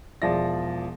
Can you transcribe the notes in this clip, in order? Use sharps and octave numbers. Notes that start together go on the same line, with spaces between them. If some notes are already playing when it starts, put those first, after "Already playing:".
E1 F3 G#4 D5 E5 A#6